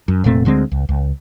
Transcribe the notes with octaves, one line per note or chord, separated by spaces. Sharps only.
F#2
F1 A#2 A3 C4
D2 D3 G#3 C4
C#2
C#2